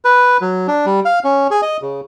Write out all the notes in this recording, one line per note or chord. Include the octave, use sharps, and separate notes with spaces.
B4
F#3
D4
G3
F5
C#4
G#4
D#5
C#3